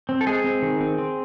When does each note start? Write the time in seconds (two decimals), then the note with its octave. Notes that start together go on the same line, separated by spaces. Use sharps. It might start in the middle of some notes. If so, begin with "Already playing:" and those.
0.09 C4
0.21 A4
0.26 G#3 G#4
0.44 C4
0.62 D#3
0.81 C4
0.98 C4